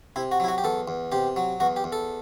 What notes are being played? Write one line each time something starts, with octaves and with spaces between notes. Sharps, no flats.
C3 E4
F#4
F#3 E4
F#4
G4
E2 A4
E2
C3 G4
F#3
E2 F#4
G4
E2
A4